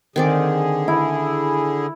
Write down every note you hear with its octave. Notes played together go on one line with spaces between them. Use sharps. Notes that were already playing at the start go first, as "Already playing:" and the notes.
D3 D#3 C4 G#4 D5
E4